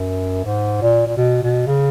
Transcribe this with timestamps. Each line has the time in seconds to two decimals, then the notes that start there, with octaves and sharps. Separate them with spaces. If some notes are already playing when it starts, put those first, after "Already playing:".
Already playing: F#2
0.45 G#2
0.81 A#2
1.07 A#2
1.17 B2
1.43 B2
1.67 C#3